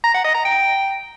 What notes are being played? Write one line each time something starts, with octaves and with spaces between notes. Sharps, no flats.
A#5
F#5
D#5
A#5
G5